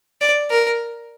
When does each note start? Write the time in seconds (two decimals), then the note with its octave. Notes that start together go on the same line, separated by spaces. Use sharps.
0.21 D5
0.50 A#4